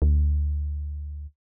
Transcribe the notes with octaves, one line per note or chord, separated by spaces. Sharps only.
D2